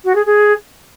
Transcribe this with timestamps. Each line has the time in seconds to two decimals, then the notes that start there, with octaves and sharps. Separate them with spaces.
0.04 F#4
0.15 G#4
0.26 G#4